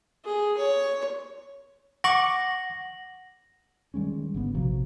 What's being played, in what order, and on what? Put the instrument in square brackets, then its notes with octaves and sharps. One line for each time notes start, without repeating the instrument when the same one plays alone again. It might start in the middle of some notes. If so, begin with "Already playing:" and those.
[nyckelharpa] G#4
C#5
[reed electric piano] F#5 [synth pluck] C#6 D6 [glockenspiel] A#6 F#7
[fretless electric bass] D#3 G3 G#3 C#4
G#1 D3 B3
A#1 C3 F3 F#3